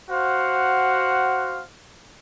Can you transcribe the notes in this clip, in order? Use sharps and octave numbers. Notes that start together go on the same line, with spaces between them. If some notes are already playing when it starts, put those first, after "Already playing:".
F#4 C5 F5 F#5